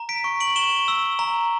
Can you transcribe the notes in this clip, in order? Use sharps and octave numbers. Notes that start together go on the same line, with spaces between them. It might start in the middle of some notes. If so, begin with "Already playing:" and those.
Already playing: A#5
B6 D7
C#6
D7 F#7
C#6 E7 G7
E6
A#5